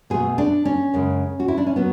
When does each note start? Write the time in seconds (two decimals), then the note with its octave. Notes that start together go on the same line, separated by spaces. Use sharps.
0.10 B2 A3 G#4
0.38 D4
0.65 C#4
0.94 F#2 C#3 G#3
1.40 F#4
1.48 E4
1.57 D4
1.67 C#4
1.76 F#3 B3